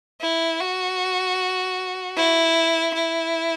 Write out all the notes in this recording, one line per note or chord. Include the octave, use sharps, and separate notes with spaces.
E4
F#4
E4
E4